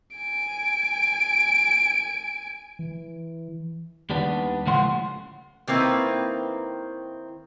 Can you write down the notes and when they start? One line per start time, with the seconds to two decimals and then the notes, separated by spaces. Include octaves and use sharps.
0.17 G#5 D7
2.79 E3
4.10 D#2 G3 B3 D4
4.66 C#2 A2 F3 F#5 C6
5.67 D#3 A#3 C4 E4 B4